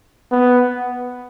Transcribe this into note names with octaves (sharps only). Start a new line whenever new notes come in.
B3